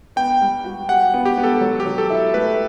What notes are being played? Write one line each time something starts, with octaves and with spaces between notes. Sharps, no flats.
B3 G5
G3
F#4
G4 F#5
B3
G4
B3
A4
F#3
G4
F#3
A4
E4
A3 B4